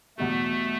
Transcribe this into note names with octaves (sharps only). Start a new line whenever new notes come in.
E2 B2 G3 A3